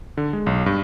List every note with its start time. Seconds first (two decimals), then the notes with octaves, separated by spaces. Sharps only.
0.17 D3
0.33 G#3
0.46 B1
0.66 G2